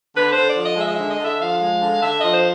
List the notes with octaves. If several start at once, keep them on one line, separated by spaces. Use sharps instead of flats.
D3 B4
D3 C5
D5
F3
D#5
G#3 E5
D#5
D3 E5
D#5
D3 E5
F3 F5
G#3
D3
D3 E5
D#5
F3
C5